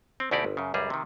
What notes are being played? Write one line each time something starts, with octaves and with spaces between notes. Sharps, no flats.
C4
D2 B2 D#4 E4 G4 D5
G1
F#2 C#3
C#2 F#2 G3 G#4
C3 D#3